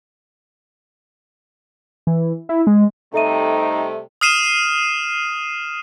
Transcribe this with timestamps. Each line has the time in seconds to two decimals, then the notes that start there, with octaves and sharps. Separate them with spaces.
2.07 E3
2.49 E4
2.67 G#3
3.14 C3 G3 A3 D#4 A4 E5 D#7
4.21 D#6 F6 C7 D#7 E7